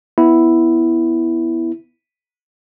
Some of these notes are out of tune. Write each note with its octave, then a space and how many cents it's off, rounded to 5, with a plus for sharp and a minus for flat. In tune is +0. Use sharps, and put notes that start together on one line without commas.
B3 +0 E4 +0